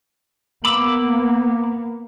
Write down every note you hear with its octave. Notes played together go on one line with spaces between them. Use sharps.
A#3 B3 B5 D6 E6